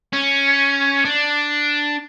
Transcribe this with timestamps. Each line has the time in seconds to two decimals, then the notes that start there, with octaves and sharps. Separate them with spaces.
0.13 C#4
1.05 D4